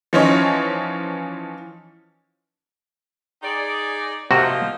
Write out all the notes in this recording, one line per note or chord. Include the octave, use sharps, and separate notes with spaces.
E3 F3 C#4 D#4 C#5
D#4 G#4 D5
C3 F3 A#3 D#4 F#4